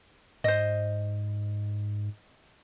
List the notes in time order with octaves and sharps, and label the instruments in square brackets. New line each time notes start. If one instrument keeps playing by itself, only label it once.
[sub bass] G#2 [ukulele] C5 D#5